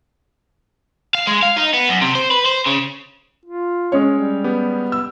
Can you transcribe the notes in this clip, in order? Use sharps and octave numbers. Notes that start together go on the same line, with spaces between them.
F5
G#3
F5
D#4
B3
F#2
C3
C5
B4
C5
C#3
F4
G#3 C#4 C#5
G3
B3 G4
E6